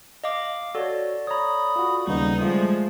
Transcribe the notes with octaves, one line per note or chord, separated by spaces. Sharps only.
D#5 F5 D6
F#4 A4 C#5 D5
C#5 A#5 B5 D#6
F4 F#4
D#2 C#3 G3 B3 D#4
F3 G#3 A3